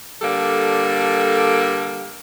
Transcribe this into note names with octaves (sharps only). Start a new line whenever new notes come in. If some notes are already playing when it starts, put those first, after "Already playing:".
D3 G3 A#3 A4